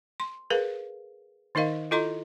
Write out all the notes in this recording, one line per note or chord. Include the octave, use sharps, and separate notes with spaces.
C6
G#4 A#4 B4 F5
D#3 D#4 A#4 D#5 F5
E4 F4 A4 D#5 A#5 C6